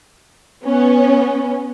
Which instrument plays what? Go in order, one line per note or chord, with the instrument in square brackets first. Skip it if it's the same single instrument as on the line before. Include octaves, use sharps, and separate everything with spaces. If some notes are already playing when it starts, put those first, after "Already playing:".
[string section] B3 C#4